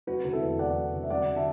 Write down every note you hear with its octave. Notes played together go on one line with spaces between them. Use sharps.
F#3 F#4 B4
D3 B4
E4 A4
E2
E2 D5 F#5
F#3
D3
E5
F#3 D5 F#5
D3
E5 A5